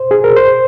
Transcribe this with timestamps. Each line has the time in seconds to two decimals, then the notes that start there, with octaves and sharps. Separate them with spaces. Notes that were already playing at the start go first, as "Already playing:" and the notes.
Already playing: C5
0.11 G#4
0.24 A#4
0.37 C5